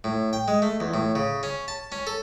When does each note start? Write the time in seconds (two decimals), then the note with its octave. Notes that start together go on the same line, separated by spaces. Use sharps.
0.04 A2
0.33 G5
0.48 G#3
0.62 A3
0.80 E2
0.94 A2
1.15 C#3
1.43 C#4
1.68 A5
1.92 C#4
2.07 A4